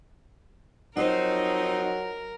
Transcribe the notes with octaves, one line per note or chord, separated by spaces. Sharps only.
F3 F#3 C4 D#4 F#4 A#4 C5